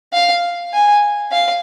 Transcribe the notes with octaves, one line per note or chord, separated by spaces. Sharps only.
F5
G#5
F5